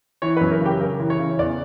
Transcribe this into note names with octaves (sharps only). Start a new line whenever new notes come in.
E3 C#5
F#2 B4
A#4
C#3
G4
C#3 A#4
E3
C#5
C#3
E2 D5